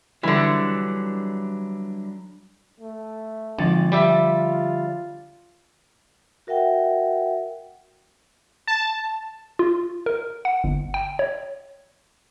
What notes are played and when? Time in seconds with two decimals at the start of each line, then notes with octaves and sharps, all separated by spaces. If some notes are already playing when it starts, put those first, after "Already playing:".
0.23 D3 E3 F#3 G3 D4
2.80 A3
3.58 G#1 D3 F3 A6
3.92 G3 F4 G4 E5
6.47 F#4 A#4 E5 F#5 G5
8.67 A5
9.59 F4
10.06 A#4
10.45 F#5
10.64 G1
10.94 G5
11.19 C#5